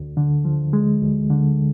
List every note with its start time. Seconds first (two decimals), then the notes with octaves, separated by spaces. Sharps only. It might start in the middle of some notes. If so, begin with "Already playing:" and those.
Already playing: D2
0.17 D3
0.45 F3
0.73 G#3
1.02 D2
1.30 D3